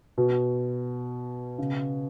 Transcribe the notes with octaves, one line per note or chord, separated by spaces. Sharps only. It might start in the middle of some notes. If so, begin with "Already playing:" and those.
B2
C#3